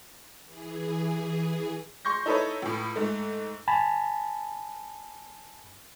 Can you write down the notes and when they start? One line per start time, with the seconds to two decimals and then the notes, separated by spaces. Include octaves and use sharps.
0.45 E3 G#4
2.05 C6 C#6 G6 A#6
2.26 D#4 E4 A4 B4 C#5
2.62 C#2 A2
2.96 G#2 A3
3.68 G#5 A5 B5